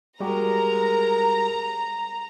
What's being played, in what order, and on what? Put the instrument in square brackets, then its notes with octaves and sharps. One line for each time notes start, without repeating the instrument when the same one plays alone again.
[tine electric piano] G3 F#4 G4 [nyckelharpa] G#3 A#4 [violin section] A#5